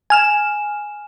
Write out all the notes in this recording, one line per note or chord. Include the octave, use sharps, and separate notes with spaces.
G#5 F6 E7